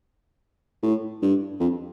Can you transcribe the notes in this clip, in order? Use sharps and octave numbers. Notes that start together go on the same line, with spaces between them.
A2
G2
F2